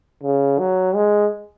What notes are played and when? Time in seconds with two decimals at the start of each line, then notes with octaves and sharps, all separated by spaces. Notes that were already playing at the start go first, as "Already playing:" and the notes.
0.23 C#3
0.59 F#3
0.95 G#3